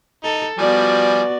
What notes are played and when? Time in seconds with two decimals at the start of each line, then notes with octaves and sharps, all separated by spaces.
0.24 D#4 A4
0.58 F3 G3 B3 F#4 D5 G#5